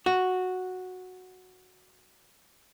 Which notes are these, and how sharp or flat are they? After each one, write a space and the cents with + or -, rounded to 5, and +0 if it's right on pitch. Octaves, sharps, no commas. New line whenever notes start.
F#4 -5